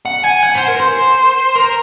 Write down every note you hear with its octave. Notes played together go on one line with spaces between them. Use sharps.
F#5
G#5
F#5
C5
A#4
C5
A#4